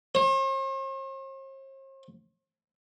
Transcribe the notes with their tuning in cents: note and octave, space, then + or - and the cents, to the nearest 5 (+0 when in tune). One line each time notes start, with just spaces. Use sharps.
C5 +45